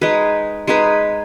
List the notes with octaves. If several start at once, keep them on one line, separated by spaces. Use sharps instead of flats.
G#3 D#4 G#4 B4
G#3 D#4 G#4 B4